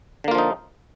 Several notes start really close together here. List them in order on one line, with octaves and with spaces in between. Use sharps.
D3 A#3 F4 F3 D#4